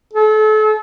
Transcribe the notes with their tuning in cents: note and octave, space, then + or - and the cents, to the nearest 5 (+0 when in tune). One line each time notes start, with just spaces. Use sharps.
A4 -35